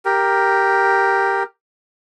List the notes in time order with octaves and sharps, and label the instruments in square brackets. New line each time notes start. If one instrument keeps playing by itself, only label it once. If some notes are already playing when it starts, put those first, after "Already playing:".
[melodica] G4 A#4